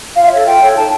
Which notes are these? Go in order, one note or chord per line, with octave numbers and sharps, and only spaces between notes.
F4 F5
E5
A4 C#5 F5
F4 G5
A4 C#5
D#4 A5